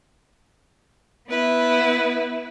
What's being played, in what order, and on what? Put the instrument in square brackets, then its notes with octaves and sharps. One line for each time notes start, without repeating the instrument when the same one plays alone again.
[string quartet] B3 E4 B4